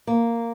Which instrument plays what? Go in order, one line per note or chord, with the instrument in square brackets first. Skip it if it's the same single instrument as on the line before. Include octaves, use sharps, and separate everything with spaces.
[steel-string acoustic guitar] A#3